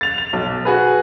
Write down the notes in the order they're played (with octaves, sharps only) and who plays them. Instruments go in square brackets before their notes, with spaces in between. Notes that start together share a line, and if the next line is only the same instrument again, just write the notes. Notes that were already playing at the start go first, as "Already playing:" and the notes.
[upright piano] A6 F7
F7
B1
F#4 G#4 B4